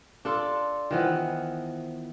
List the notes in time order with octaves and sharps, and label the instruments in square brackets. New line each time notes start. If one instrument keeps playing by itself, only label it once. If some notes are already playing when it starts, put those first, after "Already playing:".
[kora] D4 F4 A4 [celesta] C6 D6
[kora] D#3 E3 B3 [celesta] F4 C5